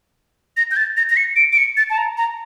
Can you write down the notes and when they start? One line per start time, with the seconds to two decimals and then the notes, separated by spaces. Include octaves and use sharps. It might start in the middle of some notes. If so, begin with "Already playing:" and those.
0.57 A#6
0.71 G6
0.77 A6
0.97 A#6
1.10 A#6
1.17 C#7
1.36 D7
1.52 D7
1.57 C#7
1.77 A6
1.90 A5
1.97 A#5
2.17 A#5